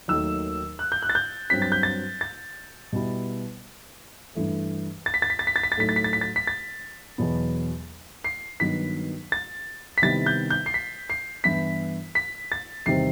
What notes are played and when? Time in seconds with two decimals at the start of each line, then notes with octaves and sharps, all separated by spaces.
0.08 D#2 D#3 F#3 A3 E6
0.79 F#6
0.92 G6
1.02 F#6
1.09 A6
1.15 G6
1.50 G2 F#3 C4 B6
1.62 A6
1.72 G6
1.83 A6
2.21 A6
2.93 B2 G3 B3 E4
4.35 G2 E3 A3
5.06 A6
5.14 B6
5.22 A6
5.30 B6
5.39 A6
5.47 B6
5.56 A6
5.63 B6
5.72 A6
5.77 A2 F#3 A3 D#4 B6
5.89 A6
5.96 B6
6.04 A6
6.13 B6
6.21 A6
6.36 B6
6.47 A6
7.18 E2 B2 F#3 B3
8.24 C7
8.60 G2 D#3 F#3 B3 B6
9.32 A6
9.98 B6
10.02 C3 D#3 G3 B3 E4 A6
10.26 G6
10.50 G6
10.66 C7
10.74 B6
11.10 C7
11.44 G2 E3 B3 E4 B6
12.15 B6
12.52 A6
12.86 E2 C3 D#3 G3 C4 C7